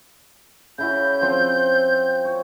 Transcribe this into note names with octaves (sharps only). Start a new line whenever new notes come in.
C#3 E4 F#4 G6
F3 C4
C#5